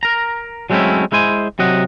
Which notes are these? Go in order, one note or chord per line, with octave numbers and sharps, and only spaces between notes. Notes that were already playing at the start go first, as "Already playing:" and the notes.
A#4 A#5
F#3 G#3 A3 C4 C#4 E4
G#3 E4 C5 G#5
C3 F#3 D#5 F#5